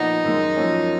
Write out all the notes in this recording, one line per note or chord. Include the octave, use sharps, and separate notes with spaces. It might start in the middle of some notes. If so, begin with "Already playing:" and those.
Already playing: A#2 F3 B3 D#4
F#2 D#3 G#3
F#2 F3 A#3 C#4